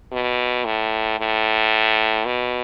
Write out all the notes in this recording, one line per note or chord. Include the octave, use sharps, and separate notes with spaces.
B2
A2
A2
B2